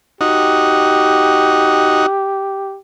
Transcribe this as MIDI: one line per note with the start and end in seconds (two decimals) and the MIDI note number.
0.21 2.06 63
0.21 2.06 66
0.21 2.79 67